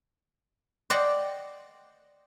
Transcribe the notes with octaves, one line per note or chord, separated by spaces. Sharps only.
C5 D5 D#5 F#5 G5